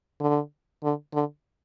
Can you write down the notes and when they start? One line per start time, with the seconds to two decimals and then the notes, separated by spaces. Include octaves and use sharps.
0.20 D3
0.83 D3
1.14 D3